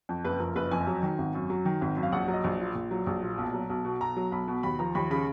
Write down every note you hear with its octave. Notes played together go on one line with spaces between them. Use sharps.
F2
F#1 B4
F3 A#4
F#1 B4
F2 G#5
F#3
D#3
G#1
F#2
F#3
D#3
G#1
F#2
F5
A#1 F#5
F#3
D#5
A#1
A#2
A#1
F#3
A#1
A#2
B1
F#3
B1
B2
B1 A#5
F#3
B1 B5
B2
D#2 B5
F3 A#5
D#2 B5
C#3 B5